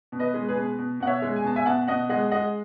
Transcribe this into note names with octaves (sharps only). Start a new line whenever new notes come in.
B2
B4 D#5
G#3
G#4 B4
B2
B2
B2 F#5
C#5 E5
G#3
G#5
B2 A5
E5 G#5
B2 F#5 A5
B2 D#5 F#5
G#3 D#5 F#5
G#3 D#5 F#5